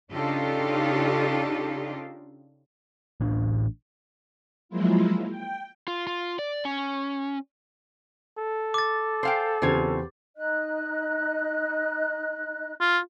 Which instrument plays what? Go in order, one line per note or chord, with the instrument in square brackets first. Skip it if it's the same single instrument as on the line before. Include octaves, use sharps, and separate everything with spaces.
[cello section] C#3 D4 D#4 F4 G4 A4
[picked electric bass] A1 A2 D4
[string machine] F3 F#3 G#3 A#3 E4 F4
G5
[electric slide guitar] F4
F4
D5
C#4
[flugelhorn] A4
[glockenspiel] D6 A6
[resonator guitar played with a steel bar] C5 F5 G5 [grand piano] G#5
[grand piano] E2 C4 G4 [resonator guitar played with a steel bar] C#3 F4 G#5
[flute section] D#4 D#5 F#6
[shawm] F4